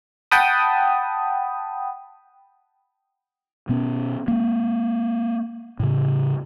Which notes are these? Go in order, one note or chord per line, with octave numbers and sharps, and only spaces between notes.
F#5 G5 A5 B5 D#6
B2 B3 C#4
G#3 A#3
A2 C#3